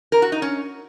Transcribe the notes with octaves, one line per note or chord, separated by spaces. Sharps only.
A#4
F#4
D#4
C#4